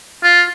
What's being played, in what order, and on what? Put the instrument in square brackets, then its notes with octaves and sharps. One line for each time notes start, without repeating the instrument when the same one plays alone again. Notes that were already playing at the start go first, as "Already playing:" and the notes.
[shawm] F4